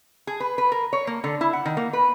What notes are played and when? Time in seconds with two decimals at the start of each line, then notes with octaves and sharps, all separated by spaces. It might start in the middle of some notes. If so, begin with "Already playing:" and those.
0.27 G#4
0.40 B4
0.58 B4
0.72 A#4
0.93 C#5
1.07 A#3
1.24 D3
1.41 E4
1.53 F#5
1.66 D#3
1.77 A#3
1.93 B4